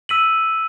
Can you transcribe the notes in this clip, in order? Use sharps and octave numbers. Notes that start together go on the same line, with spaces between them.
E6 B6 D#7 F#7